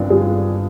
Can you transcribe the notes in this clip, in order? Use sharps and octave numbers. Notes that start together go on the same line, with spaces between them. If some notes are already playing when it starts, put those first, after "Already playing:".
Already playing: G1 D#3 C4 D4 F4
G1 F4 G#4